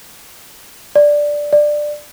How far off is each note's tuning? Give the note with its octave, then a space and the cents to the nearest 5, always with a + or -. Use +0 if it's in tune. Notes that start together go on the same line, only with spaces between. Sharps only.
D5 +0
D5 +15